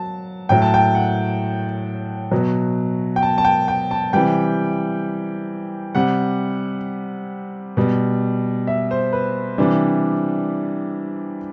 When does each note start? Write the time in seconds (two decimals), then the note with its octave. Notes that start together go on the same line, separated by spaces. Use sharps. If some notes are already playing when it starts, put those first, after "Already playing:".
Already playing: F#3 A5
0.49 A2 F#3 G5
0.62 A5
0.74 G5
0.95 F#5
2.31 B2 F#3
3.16 G5
3.22 A5
3.38 A5
3.45 G5
3.68 G5
3.91 A5
4.13 C3 E3 G3 G5
5.95 C3 G3 F#5
7.77 B2 G3
8.67 E5
8.91 C5
9.13 B4
9.58 C3 E3 G3 D4